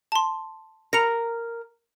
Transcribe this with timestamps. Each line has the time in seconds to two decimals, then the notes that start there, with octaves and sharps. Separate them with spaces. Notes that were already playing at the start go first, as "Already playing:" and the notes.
0.12 A5 C6
0.93 A#4 A#5 A#6 C#7 F7